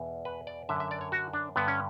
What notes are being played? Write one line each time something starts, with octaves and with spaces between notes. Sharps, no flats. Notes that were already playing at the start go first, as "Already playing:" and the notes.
Already playing: E2 B2
B4
D5
F#2 D3 E5
E5
D5
C#5
F#4
D4
G2 D3 B3
C#4